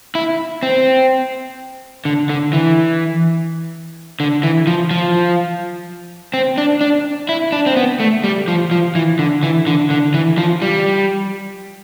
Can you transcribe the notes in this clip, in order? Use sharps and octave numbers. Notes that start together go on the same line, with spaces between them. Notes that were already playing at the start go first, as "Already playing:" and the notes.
E4
C4
D3
D3
E3
D3
E3
F3
F3
C4
D4
D4
E4
D4
C4
B3
A3
G3
F3
F3
E3
D3
E3
D3
D3
E3
F3
G3